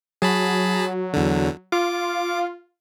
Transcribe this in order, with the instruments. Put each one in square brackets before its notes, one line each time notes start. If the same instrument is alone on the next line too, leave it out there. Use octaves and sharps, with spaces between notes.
[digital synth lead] F#3 [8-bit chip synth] G#4 A5 B5
[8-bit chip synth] E2 D3
[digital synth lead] F4 [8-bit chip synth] D6